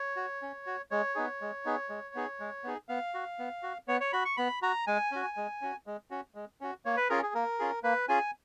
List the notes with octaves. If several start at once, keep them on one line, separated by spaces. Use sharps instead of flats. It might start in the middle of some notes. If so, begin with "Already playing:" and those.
Already playing: C#5
F#4
C#4
F#4
G#3 C#5
B3 D#4 G#4
G#3
B3 D#4 G#4
G#3
B3 D#4 G#4
G#3
B3 D#4 G#4
B3 F5
F#4
B3
F#4
B3 C#5
C#5
F#4 B5
C#6
B3 B5
F#4 A#5
G#3 G#5
C#4 F#4
G#3
C#4 F#4
G#3
C#4 F#4
G#3
C#4 F#4
A#3 C#5
B4
C#4 F4 G#4 A#4
G#4
A#3 A#4
C#4 F4 G#4
A#3 B4
C#4 F4 G#4 G#5